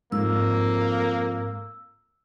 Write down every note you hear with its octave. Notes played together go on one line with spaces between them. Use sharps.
F2 G#2 A#3 E6